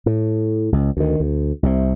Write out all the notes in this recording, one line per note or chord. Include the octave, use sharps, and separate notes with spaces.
A2
C#2
D2 D#3
D2
C2 C3